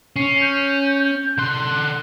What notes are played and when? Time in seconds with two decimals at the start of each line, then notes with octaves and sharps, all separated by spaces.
0.16 C#4 C7
0.41 G6
1.38 D3 C6 F#6